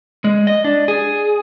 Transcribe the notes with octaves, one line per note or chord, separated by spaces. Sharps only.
G#3
D#5
D4
G#4